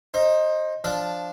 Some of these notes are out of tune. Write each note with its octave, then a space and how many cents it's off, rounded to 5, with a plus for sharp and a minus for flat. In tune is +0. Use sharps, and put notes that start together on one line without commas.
D#4 +0 C5 +20
F3 +0 D4 +0 D5 +0